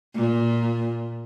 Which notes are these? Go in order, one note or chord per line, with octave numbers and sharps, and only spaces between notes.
A#2